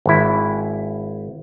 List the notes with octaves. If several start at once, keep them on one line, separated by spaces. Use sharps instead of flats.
G#1 E4